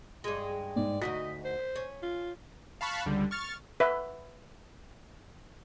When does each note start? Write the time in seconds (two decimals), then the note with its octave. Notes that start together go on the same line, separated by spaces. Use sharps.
0.24 G2 G#3 G#4
0.76 G#2 D5
1.02 D2 D#4 F#4 D#5 B6
1.45 C5
1.76 C#4
2.03 F4
2.81 F5 A5 B5 C#6 F#6
3.06 C#2 D3 G3
3.31 C#6 F6 A6
3.80 B4 E5